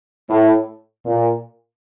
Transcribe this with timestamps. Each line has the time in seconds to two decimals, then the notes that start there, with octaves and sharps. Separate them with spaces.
0.28 A2
1.05 A#2